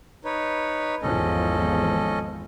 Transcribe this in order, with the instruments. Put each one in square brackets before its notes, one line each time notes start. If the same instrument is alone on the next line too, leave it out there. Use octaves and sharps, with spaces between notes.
[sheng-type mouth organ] D#4 B4 C#5
[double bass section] G#1 E2 F3 [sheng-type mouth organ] C#4 A4 D#5